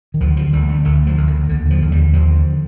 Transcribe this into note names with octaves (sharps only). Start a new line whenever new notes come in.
D#3
D2 F3
D3 F3
D2 G3
D3 A3
D2 A3
D3
F3
D2
D#3
D3
D#2 D3
D3
F3
D#2
G3
D3
D#2 F3
D3